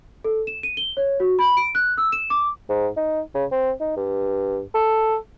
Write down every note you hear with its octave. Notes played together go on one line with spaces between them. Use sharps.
A4
E7
D#7
G7
C#5
F#4
B5
D7
F#6
E6
E7
D6
G#2
D#4
C#3
C4
D#4
G2
A4